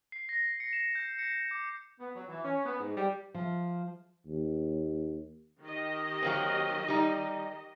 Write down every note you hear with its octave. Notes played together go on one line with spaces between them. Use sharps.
C7
A#6
C#7
E7
G6
C#7
D6
B3
F#3
E3
C#4
B3
G#2
G3
F3
D#2
D#3 G4 D#5
F#3 A#3 C4
G3 D#4